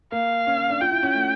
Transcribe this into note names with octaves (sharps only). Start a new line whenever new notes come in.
A#3 F5
C#4
C#4
D4
F4 G5
E4
C#4
A3